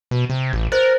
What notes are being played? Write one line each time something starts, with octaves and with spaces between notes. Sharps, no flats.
B2
C3
A1
A#4 C5 F#6 A6